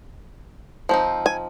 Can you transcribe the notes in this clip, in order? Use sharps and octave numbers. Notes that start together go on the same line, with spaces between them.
F3 C4 D#4
G#5